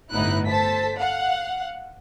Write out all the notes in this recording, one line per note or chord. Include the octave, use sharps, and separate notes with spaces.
G1 A2 B3 D#4 E4 F#6
A4 C5 A5 B6
F5 F#5